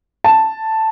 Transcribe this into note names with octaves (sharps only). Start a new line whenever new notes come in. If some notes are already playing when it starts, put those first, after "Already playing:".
A5